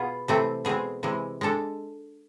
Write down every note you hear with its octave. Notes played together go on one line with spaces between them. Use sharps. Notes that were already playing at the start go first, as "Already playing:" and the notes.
Already playing: B2 B3 F4 G#4
C3 E3 A3 C4
B2 G#3 C4 G#4
C3 E3 G#3
G#3 D4 A4